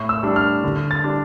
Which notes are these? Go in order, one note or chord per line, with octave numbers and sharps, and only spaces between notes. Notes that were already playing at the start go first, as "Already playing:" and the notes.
Already playing: A2 C#6
E6
G3 D4
F6
D3
A6
G3 D4